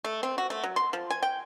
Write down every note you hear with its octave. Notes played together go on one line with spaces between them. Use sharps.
A3
C4
F#4
A3
F#3
C6
F3
G#5
G5